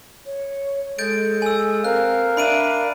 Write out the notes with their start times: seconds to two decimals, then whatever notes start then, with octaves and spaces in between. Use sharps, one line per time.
0.26 C#5
0.99 G#3 A4 G6 A6 D7
1.42 G#5 E6
1.84 C4 A#4 F5 F#6
2.37 D4 E5 B5 D7 D#7